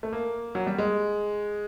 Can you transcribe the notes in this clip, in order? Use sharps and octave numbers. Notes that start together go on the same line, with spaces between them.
A3
A#3
F#3
G3
G#3